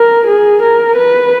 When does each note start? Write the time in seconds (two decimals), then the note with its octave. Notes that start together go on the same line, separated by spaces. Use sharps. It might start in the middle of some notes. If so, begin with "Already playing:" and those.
Already playing: A#4
0.27 G#4
0.62 A#4
0.96 B4